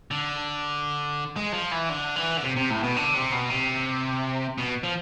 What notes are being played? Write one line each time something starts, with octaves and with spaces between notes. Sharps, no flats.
D3
G#3
F3
E3
D3
E3
D3
C3
C3
A2
B2
D3
C3
B2
C3
B2
F3